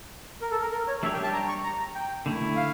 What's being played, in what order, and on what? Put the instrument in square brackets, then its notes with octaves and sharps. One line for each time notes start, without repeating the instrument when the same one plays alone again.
[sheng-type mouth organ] A#4
A4
A#4
A#4
C#5
[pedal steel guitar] G3 D4 G4 C#5 [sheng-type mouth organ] E5
[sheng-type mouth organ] G5
A5
A#5
C#6
A#5
A#5
G5
[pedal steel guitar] D3 A3 E4
[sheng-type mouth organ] F5